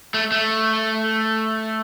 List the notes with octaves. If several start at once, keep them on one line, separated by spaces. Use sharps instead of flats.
A3
A3